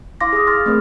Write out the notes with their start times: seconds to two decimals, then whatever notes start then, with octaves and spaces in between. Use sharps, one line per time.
0.21 E4 F5 C6 D6 A#6
0.33 G#4 D#6
0.47 C6 F6 A6
0.66 A3 C4 G#4 A#4